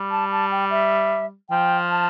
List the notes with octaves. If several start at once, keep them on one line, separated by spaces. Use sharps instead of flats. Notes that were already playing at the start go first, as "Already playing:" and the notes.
Already playing: G3
A5
A5
G5
E5
F3 G5
A5